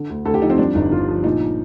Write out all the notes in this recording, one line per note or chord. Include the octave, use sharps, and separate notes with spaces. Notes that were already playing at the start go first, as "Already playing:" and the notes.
Already playing: D3
D2
D2 A4
G4
F3 D#4
C4
G2 D4
G1 D#4
G1 F4
F3
A#2 D#4